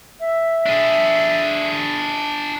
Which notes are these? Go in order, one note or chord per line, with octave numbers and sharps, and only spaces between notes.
E5
D4 G#4